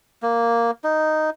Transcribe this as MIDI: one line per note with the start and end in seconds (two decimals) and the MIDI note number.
0.22 0.71 58
0.84 1.30 63